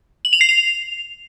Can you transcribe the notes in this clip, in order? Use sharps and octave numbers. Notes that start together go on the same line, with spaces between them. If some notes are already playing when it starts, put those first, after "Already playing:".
F#7
F7
C7
F7